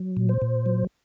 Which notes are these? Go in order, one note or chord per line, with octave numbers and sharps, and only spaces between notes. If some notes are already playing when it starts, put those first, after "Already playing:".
Already playing: F#3
A#2
C5
A#2
F#3